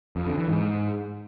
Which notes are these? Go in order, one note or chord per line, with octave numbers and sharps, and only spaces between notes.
F2
D3
E3
G#2